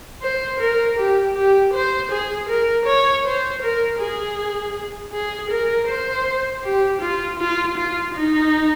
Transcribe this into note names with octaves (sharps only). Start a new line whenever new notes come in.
C5
A#4
G4
G4
C5
G#4
A#4
C#5
C5
A#4
G#4
G#4
A#4
C5
G4
F4
F4
F4
D#4